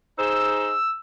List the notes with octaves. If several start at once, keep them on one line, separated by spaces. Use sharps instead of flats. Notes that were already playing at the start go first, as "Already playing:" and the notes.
D#4 G#4 C5 E6